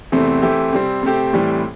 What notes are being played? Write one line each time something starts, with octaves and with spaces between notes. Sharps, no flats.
E2 C3 E3 A3 C4
E3 A3 C4 E4 G4
C3 G3 C4
C3 A3 C4 G4
A2 E3 G3 C4